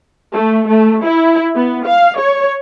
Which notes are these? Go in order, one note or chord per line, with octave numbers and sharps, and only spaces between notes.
A3
A3
E4
B3
F5
C#5